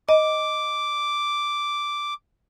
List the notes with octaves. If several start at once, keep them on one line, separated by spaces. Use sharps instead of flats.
D#5 D6